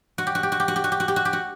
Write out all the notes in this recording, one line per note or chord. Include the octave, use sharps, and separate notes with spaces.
F#4
G4
F#4
G4
F#4
G4
F#4
G4
F#4
G4
F#4
G4
F#4
G4
F#4